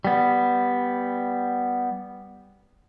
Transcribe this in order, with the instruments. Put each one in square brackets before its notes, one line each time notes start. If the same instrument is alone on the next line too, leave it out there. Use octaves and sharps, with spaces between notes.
[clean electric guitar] G3 B3